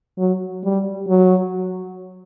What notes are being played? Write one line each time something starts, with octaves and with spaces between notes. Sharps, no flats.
F#3
G3
F#3